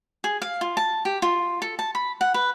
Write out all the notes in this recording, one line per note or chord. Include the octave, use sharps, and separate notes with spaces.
G#4
F5
F4
A5
G4
F4
A4
A5
B5
F#5
B4